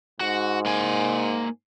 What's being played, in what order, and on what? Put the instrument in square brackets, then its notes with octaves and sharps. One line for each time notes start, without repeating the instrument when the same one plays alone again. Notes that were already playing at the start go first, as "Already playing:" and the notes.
[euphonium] G#2 [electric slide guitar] F#4
[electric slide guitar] A#3 G#5